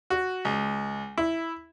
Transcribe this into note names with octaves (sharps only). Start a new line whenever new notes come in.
F#4
C#2
E4